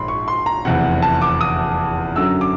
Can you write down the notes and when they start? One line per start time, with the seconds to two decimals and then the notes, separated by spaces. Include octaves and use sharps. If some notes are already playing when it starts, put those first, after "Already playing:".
Already playing: A#1 G#2 B5 C6
0.08 C#6
0.28 C6
0.46 A#5
0.65 F1 E2 C3 F#5
1.02 A5
1.22 D6
1.41 D#6
2.16 F#2 D3 F#3 E6
2.41 D6